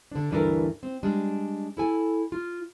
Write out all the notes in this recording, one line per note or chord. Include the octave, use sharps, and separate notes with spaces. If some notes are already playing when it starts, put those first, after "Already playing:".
D3 D4
D2 G2 E3 D4 A4 A#4
C4
G3 G#3 D4
E4 A4 G#5
F4